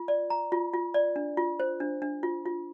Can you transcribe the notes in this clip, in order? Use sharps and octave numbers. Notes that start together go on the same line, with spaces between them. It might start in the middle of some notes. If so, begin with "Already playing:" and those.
Already playing: F4
D5
A#5
F4
F4
D5
D4
F4
C5
D4
D4
F4
F4